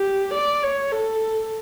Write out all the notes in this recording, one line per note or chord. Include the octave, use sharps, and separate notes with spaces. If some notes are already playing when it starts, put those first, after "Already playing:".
Already playing: G4
D5
C#5
A4